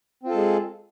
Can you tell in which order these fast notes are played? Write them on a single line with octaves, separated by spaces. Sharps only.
C4 F4 A4 G#3 G#4